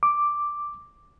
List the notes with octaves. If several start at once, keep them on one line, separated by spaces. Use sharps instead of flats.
D6